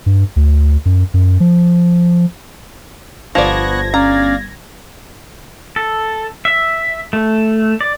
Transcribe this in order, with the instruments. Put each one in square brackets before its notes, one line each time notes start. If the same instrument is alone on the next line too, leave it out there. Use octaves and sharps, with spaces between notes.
[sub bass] G2
D2
F#2
F#2
F3
[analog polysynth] G1 G#6 A#6 [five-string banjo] F3 D5 [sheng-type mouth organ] B3 C#6 F#6
[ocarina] C#4 [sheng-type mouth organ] D5 F5 [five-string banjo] A#5
[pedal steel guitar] A4
E5
A3
D5